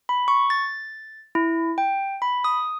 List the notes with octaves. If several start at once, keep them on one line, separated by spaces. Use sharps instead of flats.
B5
C#6
A6
E4
G5
B5
D#6